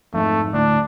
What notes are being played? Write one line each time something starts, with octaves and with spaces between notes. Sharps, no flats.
F2 G#2 A3
D2 A2 D4